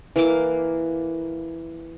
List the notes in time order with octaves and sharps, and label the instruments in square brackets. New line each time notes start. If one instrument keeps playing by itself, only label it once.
[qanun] E3 A#3 D6